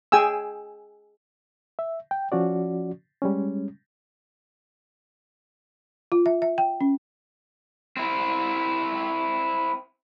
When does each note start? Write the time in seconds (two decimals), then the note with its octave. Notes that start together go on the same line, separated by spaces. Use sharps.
0.12 G#4 G5 G#5 E6
1.79 E5
2.11 G5
2.32 F3 C#4 F#4 D5
3.22 G3 G#3 C#4
6.12 F4
6.26 E5
6.42 E5
6.58 G5
6.81 C#4
7.97 C4 E4